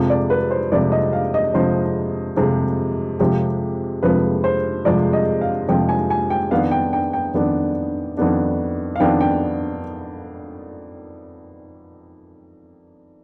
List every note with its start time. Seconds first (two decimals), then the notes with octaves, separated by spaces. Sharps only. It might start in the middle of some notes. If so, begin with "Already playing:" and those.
Already playing: F2 C3 F3 G#3
0.10 D5
0.30 B4
0.51 C5
0.71 F2 C3 F3 G#3 D5
0.92 D#5
1.13 F5
1.34 D#5
1.54 F2 C3 F3 G#3 C5
2.36 F2 C3 F3 G#3 G#4
3.19 F2 C3 F3 G#3 G4
4.03 F2 C3 F3 G#3 B4
4.44 C5
4.85 F2 C3 F3 G#3 D5
5.13 D#5
5.41 F5
5.68 F2 C3 F3 G#3 G5
5.89 G#5
6.10 G#5
6.30 G5
6.51 F2 D#3 B3 D4 F5
6.71 G5
6.93 G5
7.13 G5
7.34 F2 D#3 B3 D4
8.17 F2 D#3 B3 D4
8.96 F5
9.00 F2 D#3 B3 D4 G5
9.21 G5